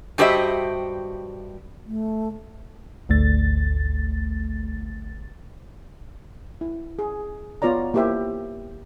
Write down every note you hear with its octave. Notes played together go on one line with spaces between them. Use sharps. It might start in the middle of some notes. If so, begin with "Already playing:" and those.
G2 F#4 G4 C5 D#5 E5
A3
G#1 D2 A3 A6
E4
G#4
B3 F4 C#5 D5 A#5
A#3 E4 G4 C5 E5